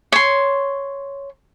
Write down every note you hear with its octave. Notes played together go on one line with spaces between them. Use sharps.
C#5 C6